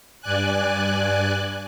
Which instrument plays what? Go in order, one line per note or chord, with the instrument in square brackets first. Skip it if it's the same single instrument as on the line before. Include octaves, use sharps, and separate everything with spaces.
[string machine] G2 D5 G#5 F#6